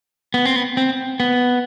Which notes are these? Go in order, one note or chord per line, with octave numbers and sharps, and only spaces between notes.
B3
C4
B3
C4
B3